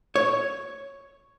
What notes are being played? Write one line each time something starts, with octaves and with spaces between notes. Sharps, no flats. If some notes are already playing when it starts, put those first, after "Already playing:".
C#5